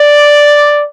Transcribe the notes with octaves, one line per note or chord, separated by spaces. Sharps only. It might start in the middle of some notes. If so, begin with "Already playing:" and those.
Already playing: D5